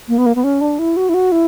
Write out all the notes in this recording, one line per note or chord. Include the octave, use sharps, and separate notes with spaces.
A#3
B3
A#3
B3
C#4
D4
E4
F#4
E4
F#4
E4